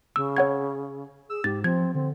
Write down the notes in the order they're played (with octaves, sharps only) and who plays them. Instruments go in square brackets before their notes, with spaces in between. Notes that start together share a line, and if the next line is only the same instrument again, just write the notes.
[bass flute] C#3 [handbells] E6
[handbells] C#5 F#5 G#6
[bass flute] G#4 [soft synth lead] E6
[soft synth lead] G#2 [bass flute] G4 [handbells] A6
[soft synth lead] F3 [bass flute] C4 [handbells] G#6
[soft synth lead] D3 [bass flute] C4